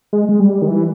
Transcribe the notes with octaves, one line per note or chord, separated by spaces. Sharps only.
G#3
G#3
G3
D#3
E3